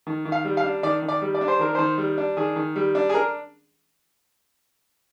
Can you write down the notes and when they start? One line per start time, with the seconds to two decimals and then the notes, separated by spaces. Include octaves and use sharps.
0.07 D#3
0.25 D#3
0.32 F5
0.45 G3
0.57 F5
0.64 D4
0.83 D#3 D5
1.02 D#3
1.08 D5
1.22 G3
1.35 D5
1.41 D4
1.48 C5
1.59 D#3 A#4
1.75 D#3 C5
1.98 G3
2.18 D4
2.37 D#3 G#4
2.56 D#3
2.76 G3
2.95 D4
3.09 G#4
3.14 D4 A#4